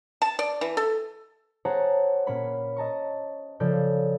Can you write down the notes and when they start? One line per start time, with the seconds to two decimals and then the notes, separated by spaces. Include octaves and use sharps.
0.22 A5
0.39 D5
0.61 E3
0.77 A4
1.65 G#4 C5 C#5 F#5 A5 A#5
2.27 A#2 A#3 C#4 C#5 B5
2.76 D#5 A5 A#5 C#6
3.60 C#3 F3 A4 D5 G6